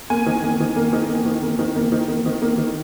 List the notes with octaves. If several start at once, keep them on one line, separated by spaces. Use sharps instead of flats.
A#3 G#5
D#3
A#3
D#3
A#3
D#3
A#3
D#3
A#3
D#3
A#3
D#3
A#3
D#3
A#3
D#3